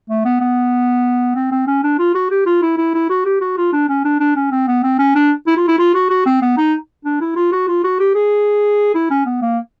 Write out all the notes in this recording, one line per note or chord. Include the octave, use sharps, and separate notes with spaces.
A3
B3
B3
C4
C4
C#4
D4
F4
F#4
G4
F4
E4
E4
E4
F#4
G4
F#4
F4
D4
C#4
D4
D4
C#4
C4
B3
C4
C#4
D4
E4
F4
E4
F4
F#4
F#4
C4
B3
D#4
D4
E4
F4
F#4
F4
F#4
G4
G#4
E4
C#4
B3
A#3